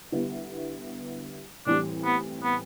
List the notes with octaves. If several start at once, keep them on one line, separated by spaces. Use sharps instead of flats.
D3 G3 B3 E4
A2 E3 G3 C4 D4
B3
B3